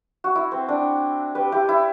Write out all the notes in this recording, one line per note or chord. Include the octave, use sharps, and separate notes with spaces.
F#4
E4
C4
D4
G4 B4
E4 G4
E4